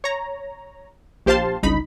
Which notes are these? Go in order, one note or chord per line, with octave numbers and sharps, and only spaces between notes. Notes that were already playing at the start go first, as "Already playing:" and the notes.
C#5 A#5
A#1 G4 C5 F5 A5 C6
G1 C#2 D#4 B5